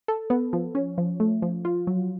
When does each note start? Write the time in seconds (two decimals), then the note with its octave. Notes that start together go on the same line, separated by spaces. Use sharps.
0.08 A4
0.30 B3
0.53 F3
0.75 C#4
0.98 F3
1.20 A3
1.42 F3
1.65 F4
1.87 F#3